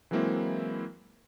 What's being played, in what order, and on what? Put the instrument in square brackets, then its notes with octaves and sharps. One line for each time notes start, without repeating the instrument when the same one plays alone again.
[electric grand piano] E3 F#3 G#3 A#3 C4 E4